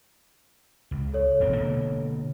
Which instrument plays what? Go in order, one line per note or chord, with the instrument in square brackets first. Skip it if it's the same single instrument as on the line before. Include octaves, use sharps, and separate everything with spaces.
[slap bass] C#2
[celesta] A4 C#5
[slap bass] E1 A#1 C4
B2 D3 A#3